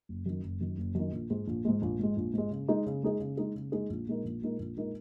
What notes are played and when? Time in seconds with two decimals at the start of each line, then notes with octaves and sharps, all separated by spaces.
0.09 F#1
0.26 F#2 D#3
0.44 F#1
0.61 F#2 D#3
0.78 F#1
0.95 F#2 D#3
1.12 A#1
1.30 G#2 G#3
1.47 A#1
1.65 G#2 G#3
1.82 A#1
1.99 G#2 G#3
2.17 A#1
2.34 G#2 G#3
2.51 C#3
2.68 G#3 D#4 G#4
2.86 C#3
3.03 G#3 D#4 G#4
3.20 C#3
3.37 G#3 D#4 G#4
3.55 C#3
3.72 G#3 D#4 G#4
3.90 A#1
4.07 A#2 G#3 D#4 A#4
4.24 A#1
4.42 A#2 G#3 D#4 A#4
4.59 A#1
4.77 A#2 G#3 D#4 A#4